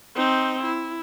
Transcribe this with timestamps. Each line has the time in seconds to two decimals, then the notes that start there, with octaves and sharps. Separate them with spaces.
0.15 C4 D#4
0.64 E4